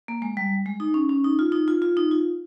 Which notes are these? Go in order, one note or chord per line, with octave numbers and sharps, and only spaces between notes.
A#3
G#3
G3
G#3
D#4
C#4
C#4
D#4
F4
D#4
F4
F4
D#4
F4